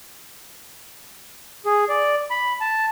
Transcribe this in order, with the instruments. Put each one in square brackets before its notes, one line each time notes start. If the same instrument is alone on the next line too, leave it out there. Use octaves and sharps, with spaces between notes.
[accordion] G#4
D5
B5
A5